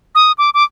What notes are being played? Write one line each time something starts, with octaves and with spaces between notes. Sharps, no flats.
D#6
D6
D6